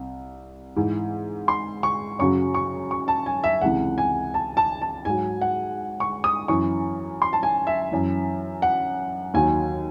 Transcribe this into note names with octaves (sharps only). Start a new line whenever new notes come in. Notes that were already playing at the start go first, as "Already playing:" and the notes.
Already playing: C2
G#2 E3
C6
C#6
F#2 C#3 F#3 C#6
C#6
C#6
A5
G#5
E5
C#2 C3 E3 F#5
G#5
A5
A5
A5
G#2 F#3 G#5
F#5
C#6
D#6
F#2 E3 C#6
C6
A5
G#5
E5
F#2 E3
F#5
D#2 D#3 F#3 G#5